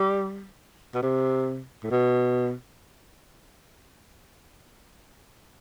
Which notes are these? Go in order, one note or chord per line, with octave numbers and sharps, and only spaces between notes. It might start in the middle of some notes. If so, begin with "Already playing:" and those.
Already playing: G3
B2
C3
A2
B2